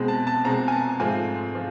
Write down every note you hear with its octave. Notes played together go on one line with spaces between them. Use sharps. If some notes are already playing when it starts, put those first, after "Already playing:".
Already playing: B2 G#3 C4
A5
A5
B2 G#3 C4 A#5
G#5
A5
G#2 F3 A3 C4 G#5
F3